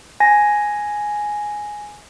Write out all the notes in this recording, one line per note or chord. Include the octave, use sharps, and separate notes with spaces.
G#5 A#6